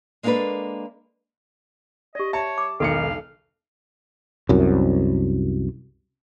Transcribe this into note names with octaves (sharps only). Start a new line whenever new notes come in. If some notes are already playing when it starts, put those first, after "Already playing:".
G#3 A#3 D4 F#4 A4 B4
G4 D5 D#5
C#5 E5 A5
D6
E1 B1 D#3 A4 F5 C#7
C2 F#2